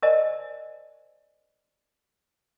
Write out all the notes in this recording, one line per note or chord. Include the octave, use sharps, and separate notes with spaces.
A#4 C5 D5 D#5 G#5 A5